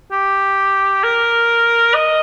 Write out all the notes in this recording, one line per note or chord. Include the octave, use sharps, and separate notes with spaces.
G4
A#4
D#5